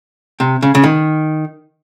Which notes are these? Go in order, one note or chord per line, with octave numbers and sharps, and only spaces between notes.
C3
C#3
C#3
D#3